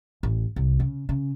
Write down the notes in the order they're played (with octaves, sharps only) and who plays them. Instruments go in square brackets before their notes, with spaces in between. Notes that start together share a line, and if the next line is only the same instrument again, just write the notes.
[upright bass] A1
C2
C#3
C#3